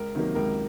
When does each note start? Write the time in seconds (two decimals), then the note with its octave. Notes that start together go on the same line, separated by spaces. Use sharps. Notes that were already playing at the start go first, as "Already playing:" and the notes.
Already playing: C#2 A#4
0.15 C3 D#3 F#3 A#3
0.35 C#2 A#4